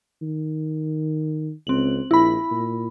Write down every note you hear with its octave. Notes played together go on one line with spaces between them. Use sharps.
D#3
C#2 C4 F#7
A#1 E4 B5
A#2